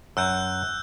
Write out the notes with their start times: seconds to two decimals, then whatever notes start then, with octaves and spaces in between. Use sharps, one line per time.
0.17 F#2 E6 F#6 G6